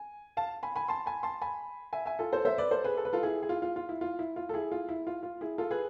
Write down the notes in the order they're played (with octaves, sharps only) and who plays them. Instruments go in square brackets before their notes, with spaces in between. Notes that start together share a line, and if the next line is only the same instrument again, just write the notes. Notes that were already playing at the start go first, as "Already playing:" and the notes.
Already playing: [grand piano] G#5
F5 A5
G#5 B5
G#5 B5
A5 C6
G#5 B5
A5 C6
G#5 B5
E5 G#5
E5 G#5
F4 A4
A4 C5
C5 E5
B4 D5
A4 C5
G#4 B4
A4
B4
F4 A4
E4 G#4
G#4
F4
F4
F4
E4
F4
E4
F4
A4
E4 G#4
F4
E4
F4
F4
E4 G#4
F4 A4
G#4 B4